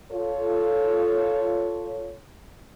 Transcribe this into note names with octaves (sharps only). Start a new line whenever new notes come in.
F4 A4 C#5